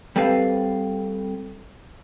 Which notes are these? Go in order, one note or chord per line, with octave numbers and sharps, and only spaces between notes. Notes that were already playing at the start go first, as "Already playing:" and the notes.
G3 C4 A4 B4 F5